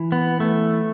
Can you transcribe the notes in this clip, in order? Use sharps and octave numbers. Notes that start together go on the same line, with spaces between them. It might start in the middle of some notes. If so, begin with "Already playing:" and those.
Already playing: E3
B3
A3